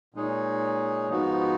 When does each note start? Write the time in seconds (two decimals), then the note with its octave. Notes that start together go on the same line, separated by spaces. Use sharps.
0.14 A#2 G#3 D#4 G#4 C#5
1.10 G#2 F3 B3 D#4 F#4